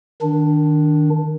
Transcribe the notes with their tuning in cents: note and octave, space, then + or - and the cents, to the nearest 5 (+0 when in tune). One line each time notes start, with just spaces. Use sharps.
D#3 -5 D4 +0